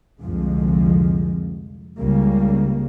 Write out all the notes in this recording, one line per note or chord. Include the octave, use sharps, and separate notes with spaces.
C2 F2 D3 F3 G#3
C#2 C#3 G3 A#3